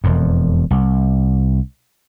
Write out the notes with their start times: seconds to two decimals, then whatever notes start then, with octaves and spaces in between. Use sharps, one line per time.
0.04 E1 F2
0.71 C2